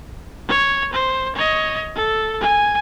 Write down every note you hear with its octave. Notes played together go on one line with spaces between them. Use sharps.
C#5
C5
C#5 D#5
A4
G#5